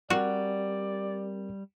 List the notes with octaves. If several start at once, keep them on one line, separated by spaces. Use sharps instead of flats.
G3 C4 F#4 G4 A#4 D5